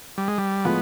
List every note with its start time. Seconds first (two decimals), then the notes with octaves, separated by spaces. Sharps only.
0.18 G3
0.28 G#3
0.38 G3
0.65 A2 F3 G#3 B3